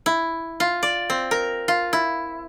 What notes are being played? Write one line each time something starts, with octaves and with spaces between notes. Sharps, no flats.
E4
F4
D5
C4
A#4
F4
E4